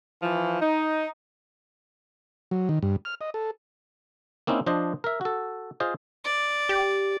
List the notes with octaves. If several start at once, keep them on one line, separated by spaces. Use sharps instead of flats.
E3 F3
D#4
F#3
D#3
G2
F6
D#5
A4
A#3 C4 C#4 D#4 E4
F3 D4 C5 D#5
A#4 E5
F#4 A4
F4 G#4 C5 D#5
D5
G4